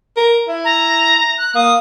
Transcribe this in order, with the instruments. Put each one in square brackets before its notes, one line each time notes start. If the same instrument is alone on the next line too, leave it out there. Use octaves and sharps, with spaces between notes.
[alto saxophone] A#4
E4
[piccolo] A#5
F#6
[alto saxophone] A#3 [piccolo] D#6